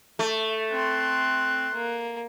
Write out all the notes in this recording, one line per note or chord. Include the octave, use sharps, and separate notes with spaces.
A3
C4 C6 F#6
A#3